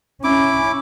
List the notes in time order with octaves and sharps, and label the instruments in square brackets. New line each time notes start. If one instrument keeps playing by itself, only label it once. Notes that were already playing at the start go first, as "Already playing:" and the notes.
[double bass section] C#4 [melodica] E4 D6